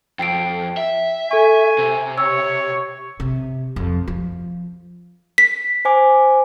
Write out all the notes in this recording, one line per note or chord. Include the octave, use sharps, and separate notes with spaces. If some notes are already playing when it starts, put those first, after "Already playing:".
F2 G5 C7 D7
E5
A4 G#5 C#6
C3
C#5 E6
C3
F2
F3
B6
C5 G#5 D6